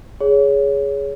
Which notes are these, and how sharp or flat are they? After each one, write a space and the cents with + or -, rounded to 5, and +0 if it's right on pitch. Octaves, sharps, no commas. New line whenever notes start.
G#4 +0 C#5 +20